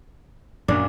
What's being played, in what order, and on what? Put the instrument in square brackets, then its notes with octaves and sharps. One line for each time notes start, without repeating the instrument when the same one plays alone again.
[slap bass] F#2 A#2 F#3 [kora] D4